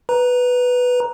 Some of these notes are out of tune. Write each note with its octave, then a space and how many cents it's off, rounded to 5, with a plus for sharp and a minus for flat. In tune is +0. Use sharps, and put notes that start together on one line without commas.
B4 +0 A#5 +10